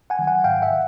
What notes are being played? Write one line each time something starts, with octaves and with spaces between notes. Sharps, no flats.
F#5 G#5
D#3 F#3
F#5 G#5
G#2 F5 G5
E5 F#5
D#3